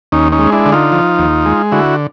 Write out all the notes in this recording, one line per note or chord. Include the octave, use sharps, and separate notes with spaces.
D#2 C#4 D#4
C#4 D#4
G#3
D4 E4
D3
D#4 F4
F3
D#2
G#3
D3 E4 F#4